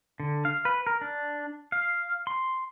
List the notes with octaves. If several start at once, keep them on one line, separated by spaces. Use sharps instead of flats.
D3
F5
B4
A#4
D4
F5
C6